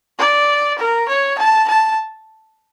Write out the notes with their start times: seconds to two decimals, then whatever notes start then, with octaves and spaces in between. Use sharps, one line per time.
0.19 D5
0.79 A#4
1.09 C#5
1.38 A5
1.68 A5